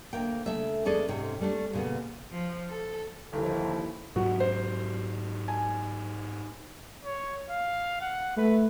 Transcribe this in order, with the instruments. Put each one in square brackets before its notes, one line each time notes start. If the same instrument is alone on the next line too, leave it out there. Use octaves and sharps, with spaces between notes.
[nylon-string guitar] D2 A#3 G5
C#3 A3 E5
E2 G#3 C#4 G#4 A4 D5
G#2 C3 C#4 G5
G3 A3 C#4 D4
A#2 C#3 B3
[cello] F3
A4
[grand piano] G1 [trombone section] D#2 A4 [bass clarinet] F3 [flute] E4
[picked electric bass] G#2 F#3 [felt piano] F#4
[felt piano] C5
G#5
[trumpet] C#5
F5
F#5
[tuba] A3 [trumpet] B4